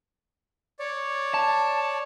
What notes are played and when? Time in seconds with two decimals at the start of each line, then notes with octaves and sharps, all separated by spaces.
0.79 C#5 D5
1.34 A5